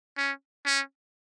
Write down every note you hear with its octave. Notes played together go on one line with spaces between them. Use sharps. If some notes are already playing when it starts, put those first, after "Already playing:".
C#4
C#4